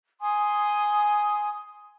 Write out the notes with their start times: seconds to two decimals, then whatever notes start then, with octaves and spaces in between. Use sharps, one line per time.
0.21 G#5 C6 D#6